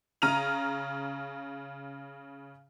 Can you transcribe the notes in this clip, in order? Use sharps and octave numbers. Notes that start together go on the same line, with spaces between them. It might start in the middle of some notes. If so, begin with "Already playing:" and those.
C#3 A#5 F6 D#7 F7